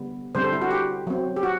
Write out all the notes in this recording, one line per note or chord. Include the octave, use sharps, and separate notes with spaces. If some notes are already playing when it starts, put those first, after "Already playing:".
Already playing: D3 G3 B3
D3 G3 C4 C5
A4
E4
F#4
G4
F#3 C4
G4
F#4